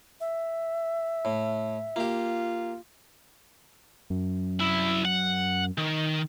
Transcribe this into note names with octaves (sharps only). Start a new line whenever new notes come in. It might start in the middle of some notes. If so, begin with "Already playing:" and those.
E5
A2
A#3 F4 G4
F#2
C2 E4
F#5
D#3